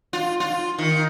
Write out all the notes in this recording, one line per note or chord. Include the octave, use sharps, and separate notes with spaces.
F4
F4
D#3